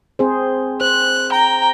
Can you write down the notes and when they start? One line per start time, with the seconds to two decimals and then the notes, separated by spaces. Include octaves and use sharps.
0.19 C4 G#4 C5
0.81 C5 F#6
1.32 G5 A#5